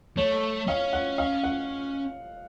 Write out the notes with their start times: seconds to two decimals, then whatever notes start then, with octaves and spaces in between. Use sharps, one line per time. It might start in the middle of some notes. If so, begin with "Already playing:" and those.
0.17 A3 C#5
0.68 C#4 F5
0.93 F#5
1.18 F5
1.43 F#5